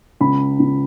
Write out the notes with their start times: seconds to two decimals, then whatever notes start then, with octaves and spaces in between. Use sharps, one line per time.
0.20 C#2 B5
0.59 C#2